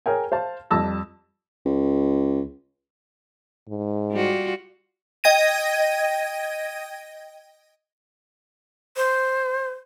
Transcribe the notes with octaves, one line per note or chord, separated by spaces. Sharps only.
G#4 A#4 C#5 G5 G#5
C5 F5 A5
F2 G3 A5 E6 A#6
C#2
G#2
G3 F4 F#4
D#5 G5 G#6 A#6 D#7
C5